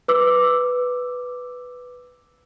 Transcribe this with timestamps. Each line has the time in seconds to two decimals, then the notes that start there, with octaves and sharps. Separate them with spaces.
0.08 B4 D6 E6